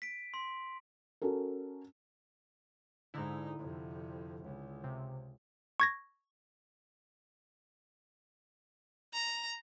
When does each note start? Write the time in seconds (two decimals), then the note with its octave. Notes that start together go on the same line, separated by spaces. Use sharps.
0.02 B6 D7
0.34 C6
1.22 C#4 F#4 A4 A#4
3.14 G#2 D3 D#4 E4
3.58 F2 C3
4.43 C#2
4.84 C3
5.80 C#6 G#6 A#6
9.14 A#5